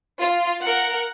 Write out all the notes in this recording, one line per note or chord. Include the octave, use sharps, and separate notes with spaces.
F4
A#4 F#5